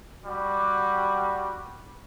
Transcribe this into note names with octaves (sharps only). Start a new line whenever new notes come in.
G3 F#4